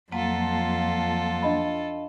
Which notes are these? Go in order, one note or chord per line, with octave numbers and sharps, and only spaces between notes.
F2 F#3 A#3 F4 A4 A5
D4 D#5 B5